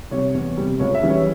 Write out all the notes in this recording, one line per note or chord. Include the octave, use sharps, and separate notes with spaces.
C3 G3 C#5
E2
C3 G3
C#2 C#5
E5
C#3 E3 G3
C#5